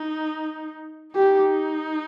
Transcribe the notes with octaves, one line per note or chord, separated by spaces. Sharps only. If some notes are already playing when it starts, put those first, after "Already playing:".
Already playing: D#4
D#4 G4